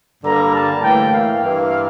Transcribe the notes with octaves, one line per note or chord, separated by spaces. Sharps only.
G2 D3 G3 A#3 A#5
A5
A2 E3 A#3 G5
F5
G2 E3 A#3